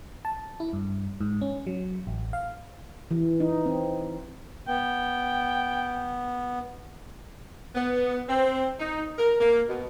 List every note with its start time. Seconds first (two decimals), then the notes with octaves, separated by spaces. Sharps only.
0.25 A5
0.60 E4
0.73 G2
1.21 G#2
1.41 C#4
1.67 F#3
2.07 A1
2.33 F5
3.11 E3
3.40 D#4
3.66 C4
4.68 B3 G5
7.75 B3
8.29 C4
8.80 D#4
9.18 A#4
9.40 A#3
9.68 B2